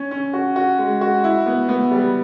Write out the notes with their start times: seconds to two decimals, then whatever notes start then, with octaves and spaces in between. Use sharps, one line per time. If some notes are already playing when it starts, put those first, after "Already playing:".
Already playing: C#4
0.11 C#4
0.33 F#4
0.56 F#4
0.79 G#3
1.01 F#4
1.24 E4
1.46 B3
1.69 B3
1.91 G3